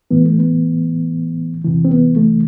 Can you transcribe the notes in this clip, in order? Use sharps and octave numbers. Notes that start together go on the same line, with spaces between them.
A2 E3 B3
A3
B3
E2 C3 E3
C4
B3
A3